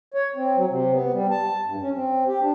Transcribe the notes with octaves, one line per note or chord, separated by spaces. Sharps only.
C#5
C4
F#3
C3
B3
G3
A5
G2
C#4
C4
G4
D4